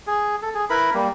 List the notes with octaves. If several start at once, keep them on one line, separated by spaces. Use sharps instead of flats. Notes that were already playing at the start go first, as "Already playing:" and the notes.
G#4
A4
G#4
E4 A#4 B4 B5
G3 A#3